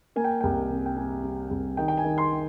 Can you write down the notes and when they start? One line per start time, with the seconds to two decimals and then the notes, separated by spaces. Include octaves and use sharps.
0.16 A#3 G#5
0.24 G5
0.41 C2 G5
0.70 C3
0.86 G5
0.97 G3 G#5
1.23 G3
1.51 C2
1.77 D#3 G5
1.88 G5
1.97 G#5
2.04 D#3
2.18 C6